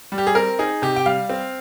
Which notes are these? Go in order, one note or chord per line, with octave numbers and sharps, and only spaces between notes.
G3
G4
G#4
C4 A#4
D#4 G#4
C3 G4
G5
G3 F5
C4